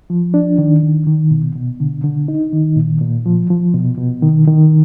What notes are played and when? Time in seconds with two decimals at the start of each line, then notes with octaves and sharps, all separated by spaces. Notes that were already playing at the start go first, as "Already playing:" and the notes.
0.10 F3
0.34 D4
0.58 D#3
0.83 D#3
1.07 D#3
1.31 B2
1.55 B2
1.80 D3
2.04 D3
2.28 D#4
2.53 D#3
2.76 A#2
3.01 A#2
3.26 F3
3.50 F3
3.74 B2
3.98 B2
4.22 D#3
4.47 D#3